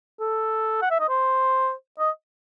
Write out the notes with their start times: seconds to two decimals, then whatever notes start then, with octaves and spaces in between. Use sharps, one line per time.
0.20 A4
0.82 F#5
0.91 E5
1.00 D#5
1.09 C5
1.99 D#5